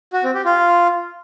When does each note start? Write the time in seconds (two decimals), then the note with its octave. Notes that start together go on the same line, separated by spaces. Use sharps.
0.13 F#4
0.24 C4
0.34 G4
0.45 F4